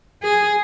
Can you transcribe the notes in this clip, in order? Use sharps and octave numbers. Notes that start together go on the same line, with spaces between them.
G#4